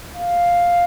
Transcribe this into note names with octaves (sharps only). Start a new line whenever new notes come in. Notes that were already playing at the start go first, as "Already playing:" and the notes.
F5